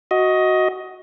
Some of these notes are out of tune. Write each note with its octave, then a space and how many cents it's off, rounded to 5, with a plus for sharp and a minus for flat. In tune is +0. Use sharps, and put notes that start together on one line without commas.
F#4 +0 D#5 +15